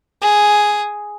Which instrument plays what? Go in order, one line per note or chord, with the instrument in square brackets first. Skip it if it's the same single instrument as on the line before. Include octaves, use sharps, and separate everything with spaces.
[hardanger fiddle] G#4